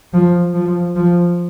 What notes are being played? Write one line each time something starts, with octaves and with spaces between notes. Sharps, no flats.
F3
F3
F3